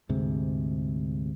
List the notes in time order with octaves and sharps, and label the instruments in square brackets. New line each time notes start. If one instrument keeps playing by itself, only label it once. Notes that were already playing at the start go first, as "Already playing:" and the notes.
[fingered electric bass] D2 G#2 C3